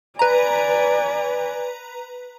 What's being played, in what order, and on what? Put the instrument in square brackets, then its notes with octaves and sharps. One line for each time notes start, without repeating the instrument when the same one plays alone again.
[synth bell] B4 A#5 [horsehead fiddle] D5 G#5